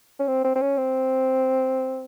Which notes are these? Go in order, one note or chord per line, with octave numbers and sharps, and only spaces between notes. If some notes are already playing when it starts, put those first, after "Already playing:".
C#4
C4
C4
C4
C#4
C4